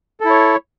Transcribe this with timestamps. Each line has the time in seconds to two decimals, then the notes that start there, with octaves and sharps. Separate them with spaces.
0.20 A4
0.25 E4
0.30 C#5